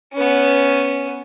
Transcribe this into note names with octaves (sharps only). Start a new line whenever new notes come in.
B3 C#4